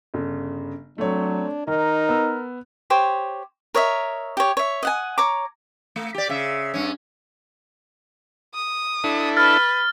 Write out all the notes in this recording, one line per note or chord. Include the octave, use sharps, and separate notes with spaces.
G1 C#3
F#3 A3 C4 D4 C#5
D#3 D#4 A#4
B3 E6
G4 C5 C#5
A#4 C#5 D#5 E5
G4 C#5
C#5 E5
D#5 F#5 G#5
C#5 A#5 D6
A3
G4 D5
C#3 E5
G2 C#4
D#6
D4 E4 A4
B4 F6 A6